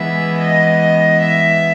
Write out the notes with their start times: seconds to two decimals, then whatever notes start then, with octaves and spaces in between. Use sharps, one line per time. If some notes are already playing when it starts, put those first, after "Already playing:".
Already playing: E3 G#3 B3 E5
0.42 D#5
1.22 E5